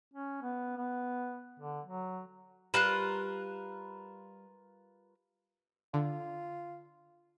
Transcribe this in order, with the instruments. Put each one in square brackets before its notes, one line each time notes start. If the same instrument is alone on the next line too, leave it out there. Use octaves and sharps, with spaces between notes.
[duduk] C#4
B3
B3
D3
F#3
[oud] G3 [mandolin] F4 A#4 B4 [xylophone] F#6 E7
[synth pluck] D3 [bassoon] F4